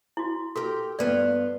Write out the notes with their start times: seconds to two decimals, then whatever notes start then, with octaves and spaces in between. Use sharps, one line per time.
0.17 E4 F#4
0.56 F#4 G4 A4 A#4 G5
0.99 G2 B3 F4 D5